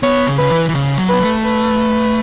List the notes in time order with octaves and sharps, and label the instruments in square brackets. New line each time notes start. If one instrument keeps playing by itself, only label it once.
[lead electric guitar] B3 [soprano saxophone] C#5
[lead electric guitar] C#3
[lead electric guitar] C#3 [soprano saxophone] B4
[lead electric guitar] E3
E3
C#3
F#3
[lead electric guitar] B3 [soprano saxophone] B4
[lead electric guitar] A3
[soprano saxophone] B4